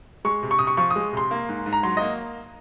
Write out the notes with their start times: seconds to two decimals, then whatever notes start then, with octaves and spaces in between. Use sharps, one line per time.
0.25 G#3 C#6
0.43 C3
0.51 C#6
0.59 C3 D#6
0.67 C#6
0.77 F3 C#6
0.91 D#6
0.96 G#3
1.13 C3 C6
1.31 A#3
1.49 G#2
1.66 G#2
1.73 A#5
1.83 F#3 C6
1.97 A#3 D#5